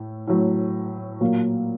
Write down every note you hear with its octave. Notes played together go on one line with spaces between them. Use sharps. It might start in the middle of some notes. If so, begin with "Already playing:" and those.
Already playing: A2 A3
A2 F#3 A3
A#2 F#3 A#3